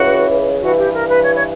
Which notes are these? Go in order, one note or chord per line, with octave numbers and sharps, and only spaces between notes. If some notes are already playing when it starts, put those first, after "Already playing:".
Already playing: C#2 C#3 E3 F#4
G2 E3 F#4
G4
A#4
B4
C#5
C#5